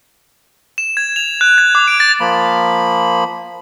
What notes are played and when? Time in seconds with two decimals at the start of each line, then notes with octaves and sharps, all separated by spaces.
0.78 E7
0.97 G#6
1.16 F7
1.41 F#6
1.58 G#6
1.75 D6
1.88 D7
2.00 A6
2.20 F3 A#3 B5